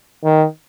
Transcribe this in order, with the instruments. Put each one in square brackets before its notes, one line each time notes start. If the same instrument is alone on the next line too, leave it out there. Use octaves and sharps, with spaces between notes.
[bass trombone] D#3